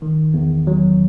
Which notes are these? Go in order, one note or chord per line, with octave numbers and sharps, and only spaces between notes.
D#3
E2
F#3